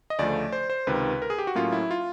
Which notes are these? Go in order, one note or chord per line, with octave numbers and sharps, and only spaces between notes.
D#5
D2 C#3 F3 A3 D5
C5
C5
C#2 C3 D#3 B4
A#4
G#4
G4
F#4
A2 F#3 A#3 C#4 F4
E4
F4